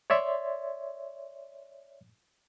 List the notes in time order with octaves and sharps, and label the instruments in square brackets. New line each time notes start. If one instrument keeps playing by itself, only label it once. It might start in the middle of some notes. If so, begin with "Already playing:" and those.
[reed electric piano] C#5 D5 E5 C6